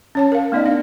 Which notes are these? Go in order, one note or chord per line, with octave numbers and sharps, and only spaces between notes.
C#4 C#5 A5
A#4 F5
A3 B3 D#4 D5 D#5
D4 F5